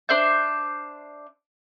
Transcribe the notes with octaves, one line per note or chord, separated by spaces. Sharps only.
D4 C5 E5 G6